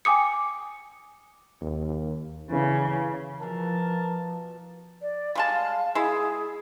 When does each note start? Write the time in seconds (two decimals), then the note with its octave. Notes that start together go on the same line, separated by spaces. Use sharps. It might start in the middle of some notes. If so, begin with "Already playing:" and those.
0.05 G5 G#5 D6 D#6 C#7
1.61 D#2
2.50 C#3 E3
3.40 B2 E3 F3 A#4 A5
5.02 D5
5.35 G3 G#3 F5 A5
5.95 G#3 E4 G#4